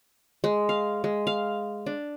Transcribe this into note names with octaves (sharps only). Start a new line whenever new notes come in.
G#3
F5
G#3
F5
D4